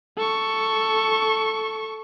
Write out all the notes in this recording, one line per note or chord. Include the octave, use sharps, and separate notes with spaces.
A4 C#6